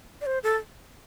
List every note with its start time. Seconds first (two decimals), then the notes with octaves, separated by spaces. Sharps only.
0.21 D5
0.26 C5
0.44 A4